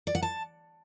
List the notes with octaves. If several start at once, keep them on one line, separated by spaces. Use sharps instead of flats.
D5
F#5
A5